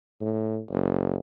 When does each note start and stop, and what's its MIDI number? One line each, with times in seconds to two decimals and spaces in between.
0.21 0.60 45
0.70 1.17 30